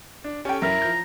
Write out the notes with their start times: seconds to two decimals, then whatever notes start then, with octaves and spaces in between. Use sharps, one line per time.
0.24 D4
0.45 C#4 G4 A4 G5
0.62 F#2 E4 A#4 E5 A#5
0.82 F3 G6